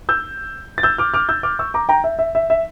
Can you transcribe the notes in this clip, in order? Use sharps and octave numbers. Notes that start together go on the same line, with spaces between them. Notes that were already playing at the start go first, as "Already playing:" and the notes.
E6 G6
A6
E6 G6
D6 F6
D6 F6
E6 G6
D6 F6
C#6 E6
A#5 D6
G5 A#5
E5
E5
E5
E5